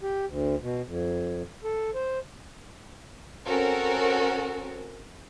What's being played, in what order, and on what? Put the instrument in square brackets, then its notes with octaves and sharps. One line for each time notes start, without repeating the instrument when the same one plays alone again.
[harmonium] G4
D2
B2
F2
A4
C5
[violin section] C4 C#4 F#4 A4 A#4